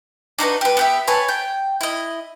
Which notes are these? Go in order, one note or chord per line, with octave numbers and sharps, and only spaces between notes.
D4 D#4 F#4 B4
G4 B4
B3 G4 E5
B4 C#5 G#5 A5
G5
E4 D#5